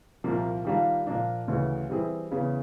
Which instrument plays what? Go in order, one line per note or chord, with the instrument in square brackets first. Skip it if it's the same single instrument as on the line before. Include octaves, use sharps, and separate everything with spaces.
[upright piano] C2 A#2 F3 A#3
D#3 G3 A#3 D4 F4
A#2 F3 A#3 D4
D2 C#3 E3
E3 G3 C4 E4 G#4
E2 C#3 E3